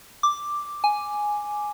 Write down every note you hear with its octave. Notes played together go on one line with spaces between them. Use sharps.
D6
G#5